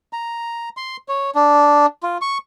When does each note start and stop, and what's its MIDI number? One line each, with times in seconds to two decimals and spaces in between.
0.13 0.69 82
0.77 0.97 84
1.08 1.30 73
1.35 1.86 62
2.03 2.18 65
2.21 2.38 85